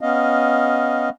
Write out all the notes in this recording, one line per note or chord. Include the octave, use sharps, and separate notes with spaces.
B3 C#4 D#5 F5